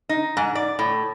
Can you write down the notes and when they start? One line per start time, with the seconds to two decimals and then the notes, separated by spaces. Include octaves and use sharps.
0.09 D#4
0.37 G#2
0.55 D5
0.79 A2